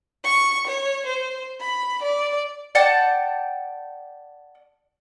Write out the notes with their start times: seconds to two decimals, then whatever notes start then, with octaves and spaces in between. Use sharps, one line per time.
0.24 C#6
0.67 C#5
1.06 C5
1.60 B5
2.02 D5
2.75 D5 F#5 G5 A5